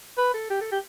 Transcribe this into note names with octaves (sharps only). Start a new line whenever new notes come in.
B4
A4
G4
A4
G4